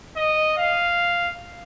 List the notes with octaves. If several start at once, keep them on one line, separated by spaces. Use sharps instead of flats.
D#5
F5